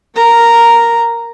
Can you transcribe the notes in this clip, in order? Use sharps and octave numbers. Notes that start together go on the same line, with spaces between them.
A#4 A#5